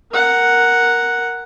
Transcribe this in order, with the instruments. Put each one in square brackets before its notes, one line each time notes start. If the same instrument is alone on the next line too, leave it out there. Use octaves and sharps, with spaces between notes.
[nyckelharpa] A#4 F#5